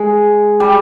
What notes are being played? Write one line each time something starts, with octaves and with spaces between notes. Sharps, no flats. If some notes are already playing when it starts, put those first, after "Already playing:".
Already playing: G#3
G3